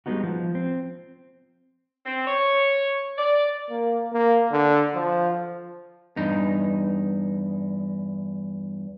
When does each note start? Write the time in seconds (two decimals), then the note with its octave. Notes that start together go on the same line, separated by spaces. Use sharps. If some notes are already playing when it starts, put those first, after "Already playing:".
0.06 G3 G#3 B3 D#4 F#4
0.23 F3
0.55 C4
2.05 C4
2.27 C#5
3.17 D5
3.70 A#3
4.13 A#3
4.51 D3
4.94 F3
6.16 E2 G2 D#4